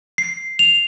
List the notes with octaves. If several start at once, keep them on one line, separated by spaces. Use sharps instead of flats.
C7
F7